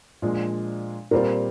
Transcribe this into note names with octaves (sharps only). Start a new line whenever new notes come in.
A#2 F3 G#3 D4
A#2 G3 C4 F4 A#4